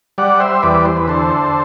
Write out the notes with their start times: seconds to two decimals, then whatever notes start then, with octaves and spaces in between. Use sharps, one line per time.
0.18 G3 D5 F#5
0.40 C5 E5
0.63 E2 B4 D5
0.85 C5
0.97 B4
1.08 D3 A4 C5